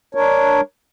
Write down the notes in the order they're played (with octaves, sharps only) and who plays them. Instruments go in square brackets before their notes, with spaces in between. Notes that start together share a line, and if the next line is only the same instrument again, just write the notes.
[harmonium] D4 A#4 C#5